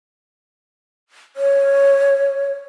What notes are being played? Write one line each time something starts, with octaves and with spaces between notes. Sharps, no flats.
C#5